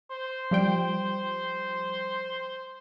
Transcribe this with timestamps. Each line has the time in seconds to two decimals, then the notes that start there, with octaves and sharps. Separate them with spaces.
0.11 C5
0.51 F3 G3 G5